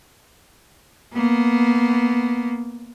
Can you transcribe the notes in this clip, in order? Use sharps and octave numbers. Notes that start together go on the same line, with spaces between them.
A#3 B3